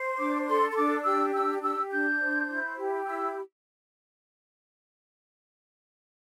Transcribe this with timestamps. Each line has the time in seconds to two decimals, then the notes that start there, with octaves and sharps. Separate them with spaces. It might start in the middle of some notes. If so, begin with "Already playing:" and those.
Already playing: C5
0.18 D4 D6
0.46 A4 C6
0.71 C6
0.76 D4 D6
1.04 G4 E6
1.33 D4 E6
1.62 G4 E6
1.91 D4 G6
2.20 C5
2.49 E4
2.77 G4
3.06 E4 E6